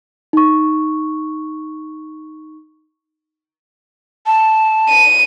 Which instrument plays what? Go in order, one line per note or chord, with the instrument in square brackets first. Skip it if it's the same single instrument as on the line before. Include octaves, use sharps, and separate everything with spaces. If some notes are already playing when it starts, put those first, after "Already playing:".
[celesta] D#4 C#6
[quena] A5
[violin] D#7